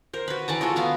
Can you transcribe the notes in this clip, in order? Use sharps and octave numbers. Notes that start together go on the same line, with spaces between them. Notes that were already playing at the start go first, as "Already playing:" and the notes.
A#4 C5
F#4 B4
E3 D5 A5 A#5
G#3 A3 F4 F#4
B3 F5 A#5